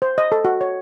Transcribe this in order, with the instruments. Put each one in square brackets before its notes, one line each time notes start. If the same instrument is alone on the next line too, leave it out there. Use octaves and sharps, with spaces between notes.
[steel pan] C5
D#5
A4
F#4
C#5